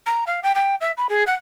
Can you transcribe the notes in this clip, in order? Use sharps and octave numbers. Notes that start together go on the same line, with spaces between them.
A#5
F5
G5
G5
E5
B5
G#4
F#5